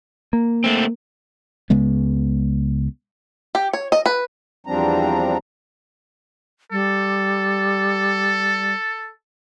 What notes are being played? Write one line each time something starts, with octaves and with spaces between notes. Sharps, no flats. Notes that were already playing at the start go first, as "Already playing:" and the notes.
A#3
A3 C4
C#2 C#3 G#3 B3
G4
C#5
D#5
B4
E2 F3 G3 C4 D4 A#5
G3 A4